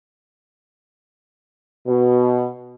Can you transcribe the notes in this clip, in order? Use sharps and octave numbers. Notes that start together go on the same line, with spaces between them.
B2